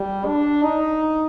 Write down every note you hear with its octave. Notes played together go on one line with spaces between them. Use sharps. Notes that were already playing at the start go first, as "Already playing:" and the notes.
Already playing: G3
D4
D#4